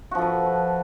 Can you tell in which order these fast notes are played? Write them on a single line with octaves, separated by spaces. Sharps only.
F#4 F3 A4 B4